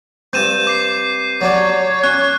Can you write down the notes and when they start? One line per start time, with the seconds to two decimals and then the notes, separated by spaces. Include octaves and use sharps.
0.33 G2 C4 G6 D#7 E7
0.67 D6 C7 E7
1.41 F#3 D4 G4 C#5
2.04 C#4 F#6